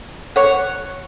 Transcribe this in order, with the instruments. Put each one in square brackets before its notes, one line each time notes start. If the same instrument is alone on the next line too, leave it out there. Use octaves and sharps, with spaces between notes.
[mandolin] C#5 F#5